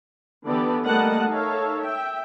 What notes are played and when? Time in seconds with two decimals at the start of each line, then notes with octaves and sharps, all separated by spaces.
0.47 D3 E3 B3 G4 A4 D5
0.84 G3 A3 A#3 D#5 F#5 A5
1.28 D#4 A4 A#4 C#5 E5 F5
1.80 E5 G5